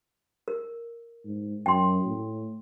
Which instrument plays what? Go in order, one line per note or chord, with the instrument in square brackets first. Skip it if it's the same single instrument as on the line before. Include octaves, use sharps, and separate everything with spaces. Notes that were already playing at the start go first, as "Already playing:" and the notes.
[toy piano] A#4
[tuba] G#2
[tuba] F#2 [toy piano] G5 C6
[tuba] A2